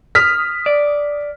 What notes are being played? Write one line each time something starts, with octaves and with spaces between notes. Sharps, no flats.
D#6 F6 B6
D5